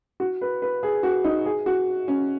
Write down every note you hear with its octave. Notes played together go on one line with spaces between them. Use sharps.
F#4
B4
B4
G#4
F#4
D#4
G#4
F#4
C#4